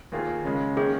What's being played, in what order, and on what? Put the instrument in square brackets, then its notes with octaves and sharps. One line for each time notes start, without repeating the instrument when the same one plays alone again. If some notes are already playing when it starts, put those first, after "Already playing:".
[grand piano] D#2 D#3 A#3 F4 G#4
C#3 G#3 C#4
[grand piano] D#3 A#3 C#4 [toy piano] G#4